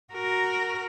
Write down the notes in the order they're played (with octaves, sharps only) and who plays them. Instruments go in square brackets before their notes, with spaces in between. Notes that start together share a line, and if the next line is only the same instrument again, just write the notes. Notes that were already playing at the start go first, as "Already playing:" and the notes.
[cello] F#4 A#4